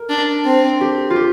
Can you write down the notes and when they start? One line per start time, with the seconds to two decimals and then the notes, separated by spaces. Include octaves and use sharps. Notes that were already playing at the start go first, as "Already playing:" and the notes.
Already playing: A#4
0.10 D4
0.45 C4
0.81 G4
1.10 F4
1.16 G4